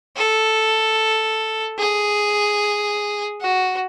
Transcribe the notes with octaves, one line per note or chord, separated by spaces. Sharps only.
A4
G#4
F#4